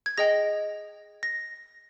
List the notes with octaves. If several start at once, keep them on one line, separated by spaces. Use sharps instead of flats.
G#6
G#4 D#5 G5 A#6
A#6